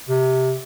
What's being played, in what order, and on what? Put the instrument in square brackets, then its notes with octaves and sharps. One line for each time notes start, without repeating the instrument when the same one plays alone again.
[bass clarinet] C3